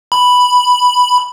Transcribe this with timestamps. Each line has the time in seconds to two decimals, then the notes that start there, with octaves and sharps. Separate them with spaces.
0.12 B5